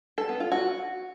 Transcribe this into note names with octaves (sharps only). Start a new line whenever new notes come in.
A4
B3
F4
F#4